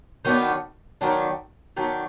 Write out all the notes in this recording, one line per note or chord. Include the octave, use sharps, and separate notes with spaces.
D#3 F#3 B3 D4
D#3 F#3 B3 D4
D#3 F#3 B3 D4